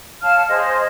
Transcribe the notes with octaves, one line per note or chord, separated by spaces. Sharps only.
C#5 F5 A5 F6
G#4 C5 D#5